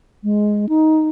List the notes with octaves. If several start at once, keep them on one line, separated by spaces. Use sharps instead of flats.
G#3
D#4